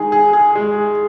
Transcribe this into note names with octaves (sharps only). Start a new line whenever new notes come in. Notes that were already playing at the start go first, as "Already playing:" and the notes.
Already playing: D#3 G#3 G#4
G#4
G#4
G#3